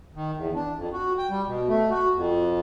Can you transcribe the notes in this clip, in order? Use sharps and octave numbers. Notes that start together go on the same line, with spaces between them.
D#3
E2
D4
F2
F#4
G5
G3
B2
A3
F#4
F2